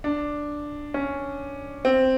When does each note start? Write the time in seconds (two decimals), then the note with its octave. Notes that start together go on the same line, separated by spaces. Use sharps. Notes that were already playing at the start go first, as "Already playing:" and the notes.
0.04 D4
0.94 C#4
1.85 C4